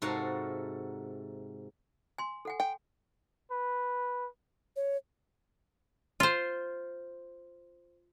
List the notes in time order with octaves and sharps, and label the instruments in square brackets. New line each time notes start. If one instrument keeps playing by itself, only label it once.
[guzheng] G#2 C3 F#4 A4 A#4 F5
[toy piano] G#5 C6
A4 F#5 G#5
[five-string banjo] G5 [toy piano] G#5
[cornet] B4
[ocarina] C#5
[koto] F4 C5